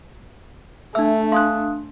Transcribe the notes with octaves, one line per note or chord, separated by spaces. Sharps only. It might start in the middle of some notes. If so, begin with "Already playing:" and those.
A3 D4 E5 E6
D4 F5 C6 D#6 F#6